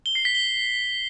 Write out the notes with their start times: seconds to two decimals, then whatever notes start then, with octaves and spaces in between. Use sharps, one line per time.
0.06 G7
0.15 C7
0.25 B6
0.35 G7